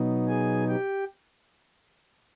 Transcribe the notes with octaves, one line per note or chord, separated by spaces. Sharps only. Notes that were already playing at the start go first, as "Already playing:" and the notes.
Already playing: B2 F#3 B3 D#4
G#4 G#5
G4 G5